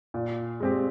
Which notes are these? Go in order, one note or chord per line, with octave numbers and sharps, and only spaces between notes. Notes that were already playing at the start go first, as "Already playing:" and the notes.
A#2
G#3 C4 G4